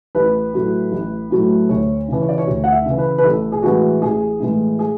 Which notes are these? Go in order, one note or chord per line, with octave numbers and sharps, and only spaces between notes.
A1 B4
A2 F#3 A3
A1
A2 F#3 A3
D2 C#5
C#3 E3
C#5
D5
C#5
D2
F#5
E5
C#3 E3
B4
B4
A1 A4
G#4
A2 E3 G#3 F#4
A1 G#4
A2 E3 G#3
G#4